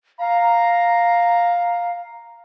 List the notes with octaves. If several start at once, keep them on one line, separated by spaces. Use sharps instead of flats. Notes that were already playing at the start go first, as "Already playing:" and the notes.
F5 A#5